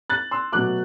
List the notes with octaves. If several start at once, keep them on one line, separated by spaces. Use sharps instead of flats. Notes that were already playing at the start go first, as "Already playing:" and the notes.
F#6 A6
C6 E6
B2 F#3 A3 D6 F#6